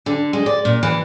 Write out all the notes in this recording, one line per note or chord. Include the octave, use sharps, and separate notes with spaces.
D3
G#3
D5
A#2
E3